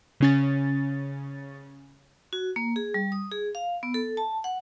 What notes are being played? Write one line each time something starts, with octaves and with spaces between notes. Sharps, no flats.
C#3 C#4 A6
F#4
A#3
G#4
G3
D#6
G#4
F5
B3
A4
A5
F#5